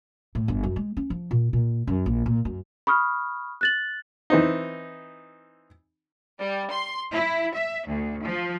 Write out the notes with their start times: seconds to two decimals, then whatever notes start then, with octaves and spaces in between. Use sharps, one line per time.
0.35 A2
0.48 G1
0.63 F#2
0.76 G#3
0.97 C#4
1.10 F3
1.31 A#2
1.53 A#2
1.87 F#2
2.06 A#1
2.26 A#2
2.45 F#2
2.87 B5 C#6 D#6 F6
3.61 F#6 A6 F#7
4.30 E3 C4 D#4
6.40 G3
6.71 C6
7.11 E4
7.53 E5
7.86 D2
8.23 F3